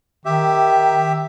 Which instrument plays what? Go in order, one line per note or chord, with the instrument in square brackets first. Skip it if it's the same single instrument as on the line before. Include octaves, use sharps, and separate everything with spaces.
[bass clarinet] D#3 [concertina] G4 E5